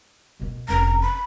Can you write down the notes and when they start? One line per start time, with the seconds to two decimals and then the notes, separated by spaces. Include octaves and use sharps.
0.40 B2 A#3
0.69 F1 C#4 A#5
1.02 B5